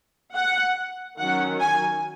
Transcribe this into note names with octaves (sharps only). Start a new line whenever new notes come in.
F#5
D#3 F#3 C#4 F#5
G#5